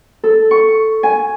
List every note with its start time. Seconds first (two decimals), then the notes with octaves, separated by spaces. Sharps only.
0.24 A4
0.51 C#6
1.03 G#5